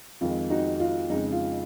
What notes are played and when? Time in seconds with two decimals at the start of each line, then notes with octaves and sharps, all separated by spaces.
0.21 F2 D#3 G#3 F4
0.50 D#4 F#4
0.80 F4
1.10 F2 C#3 G#3 D#4
1.32 F4